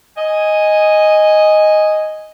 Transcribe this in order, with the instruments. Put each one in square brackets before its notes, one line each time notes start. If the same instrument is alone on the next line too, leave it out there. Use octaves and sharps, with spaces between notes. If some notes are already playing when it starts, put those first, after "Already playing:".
[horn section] D#5 G#5